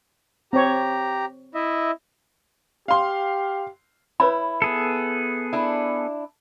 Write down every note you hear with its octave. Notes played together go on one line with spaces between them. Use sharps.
C4 G4 C#5 A#5
E4 D#5 E5
G4 F5 C6
E4 B4 C#5 B5
B3 G#4 A4
D4 E4